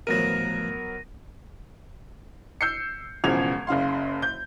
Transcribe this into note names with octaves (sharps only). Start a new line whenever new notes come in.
A1 D2 F3 F#3 B3 A#4 A#6 D#7
E6 G6 C7 C#7
E1 E2 C#3 F3 G#6 F7
F#1 C#3 F5 C6
G6